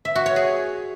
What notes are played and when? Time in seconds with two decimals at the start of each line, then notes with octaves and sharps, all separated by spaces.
0.05 E5
0.15 F#4
0.26 C#5
0.36 G#4